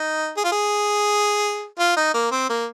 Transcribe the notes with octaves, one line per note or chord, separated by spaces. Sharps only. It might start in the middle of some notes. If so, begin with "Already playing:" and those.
Already playing: D#4
G#4
F4
G#4
F4
D#4
A#3
C4
A#3